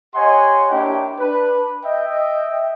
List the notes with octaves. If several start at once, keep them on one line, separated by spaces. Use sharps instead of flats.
G4 C#5 D#5 F#5 G#5 C6
A#3 D4 E4 G4 C#5 G5
D4 B4
D#5 E5 G5